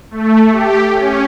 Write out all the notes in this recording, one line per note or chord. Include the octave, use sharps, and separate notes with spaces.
A3
G4
C#4